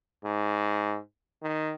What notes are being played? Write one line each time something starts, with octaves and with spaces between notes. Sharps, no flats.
G#2
D#3